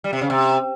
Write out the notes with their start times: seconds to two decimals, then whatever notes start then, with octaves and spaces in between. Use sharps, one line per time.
0.04 G3
0.13 C3
0.21 C#3
0.30 C3